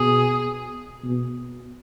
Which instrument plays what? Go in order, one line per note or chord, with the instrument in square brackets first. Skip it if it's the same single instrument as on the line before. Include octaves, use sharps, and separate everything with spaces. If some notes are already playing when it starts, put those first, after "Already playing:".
Already playing: [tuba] B2 [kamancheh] G#4
[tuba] B2